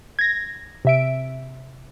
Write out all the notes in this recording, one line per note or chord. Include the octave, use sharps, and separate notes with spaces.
G#6 A#6
C3 E5 D7